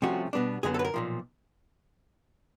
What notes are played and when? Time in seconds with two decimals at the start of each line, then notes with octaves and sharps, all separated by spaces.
0.02 C2 C3 F3 A3 C#4 F#4
0.33 B2 G3 B3 D4
0.63 F#2 D3 F#3 B3 G#4
0.74 A4
0.79 B4
0.85 A#4
0.94 B1 A#2 F3